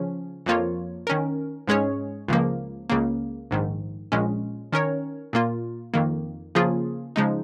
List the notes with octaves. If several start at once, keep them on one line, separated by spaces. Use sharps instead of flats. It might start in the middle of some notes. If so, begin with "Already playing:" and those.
Already playing: C#3 F3 C#4
F2 F3 A#3 F4 C#5
D#3 C#4 A#4
G#2 G#3 C#4 G#4 C#5
C#2 C#3 F3 A#3
C#2 C#3 A#3
A#1 G#2 D#3
A#1 A#2 G#3 C#4
D#3 C#4 A#4 C#5
A#2 A#3 F4
F2 D#3 A#3
C#3 F3 A#3 F4 G#4
C#3 F3 G#3 D#4